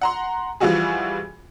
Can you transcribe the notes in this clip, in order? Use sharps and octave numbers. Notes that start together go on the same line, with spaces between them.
F#5 A#5 C6
E3 F3 G3 F4 F#4 G#4